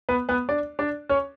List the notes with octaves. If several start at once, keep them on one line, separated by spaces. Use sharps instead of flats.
B3 B4
B3 B4
D4 D5
D4 D5
C#4 C#5